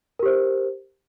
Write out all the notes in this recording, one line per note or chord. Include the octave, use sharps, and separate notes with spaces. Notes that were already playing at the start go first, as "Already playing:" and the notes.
G4 A#4 C5